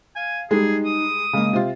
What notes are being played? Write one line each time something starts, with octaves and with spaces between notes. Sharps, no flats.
F5 G#5
G3 G#3 D#4 G#4
D#6
C#3 G#3 A#3
C3 F4